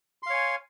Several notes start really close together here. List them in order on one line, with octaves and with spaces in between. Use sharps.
C6 F5 C#5 G#5